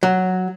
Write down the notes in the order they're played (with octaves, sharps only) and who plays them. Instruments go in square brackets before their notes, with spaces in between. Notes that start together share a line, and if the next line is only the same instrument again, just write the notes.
[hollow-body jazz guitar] F#3